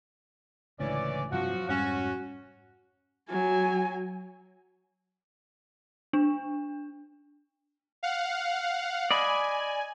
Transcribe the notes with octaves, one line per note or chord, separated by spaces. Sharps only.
C#2 A2 D3 E3 C#4 D5
G2 C3 F3 F#3 F#4
F1 G#2 G3 C#4 F#4
F#3 G#5
D4
F5 F#5
D5 D#5 G#5 B5